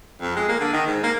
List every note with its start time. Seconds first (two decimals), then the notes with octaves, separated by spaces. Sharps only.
0.21 F2
0.36 G#3
0.48 A#3
0.60 D3
0.73 D#3
0.87 G#2
1.03 A#3